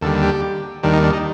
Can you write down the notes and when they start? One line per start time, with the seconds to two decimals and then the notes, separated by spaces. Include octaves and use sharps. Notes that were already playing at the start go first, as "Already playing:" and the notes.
0.01 D#2 D3 G3 A4
0.23 G4
0.83 D#2 D#3 G3 D4
0.93 D#4
1.03 D4
1.13 D#4